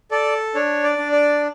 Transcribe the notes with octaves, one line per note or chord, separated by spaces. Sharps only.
A4 D5
D4 C#5
D5
D4
D5